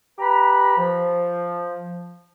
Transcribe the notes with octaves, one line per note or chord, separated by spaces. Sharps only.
G4 B4 A#5 B5
F3